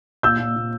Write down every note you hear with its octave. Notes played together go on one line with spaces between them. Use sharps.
A#2 E6 G6
A#2
A#2